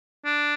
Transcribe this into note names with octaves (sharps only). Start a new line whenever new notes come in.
D4